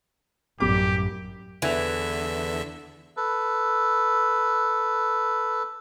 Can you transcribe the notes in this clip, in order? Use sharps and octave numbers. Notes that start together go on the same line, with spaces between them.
A1 F#2 G3 G4 D6
E2 D3 E3 E5
A4 B4